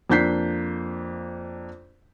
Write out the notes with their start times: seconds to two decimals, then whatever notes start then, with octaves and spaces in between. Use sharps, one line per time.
0.10 F2 A#3 D4 G6 B6 C7